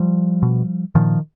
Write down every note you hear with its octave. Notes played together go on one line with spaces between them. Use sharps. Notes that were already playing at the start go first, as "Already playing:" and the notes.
Already playing: F3 G3
B2
A#2 D#3 F3